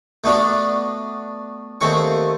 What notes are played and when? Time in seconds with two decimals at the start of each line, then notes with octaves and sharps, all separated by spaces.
0.24 A3 B3 D4 F#4
1.81 D#2 A3 C4 C#6